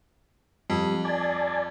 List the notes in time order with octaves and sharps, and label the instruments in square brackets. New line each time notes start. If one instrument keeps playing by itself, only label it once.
[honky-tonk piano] F2 [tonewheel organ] G3
[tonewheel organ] D5 G#5 A5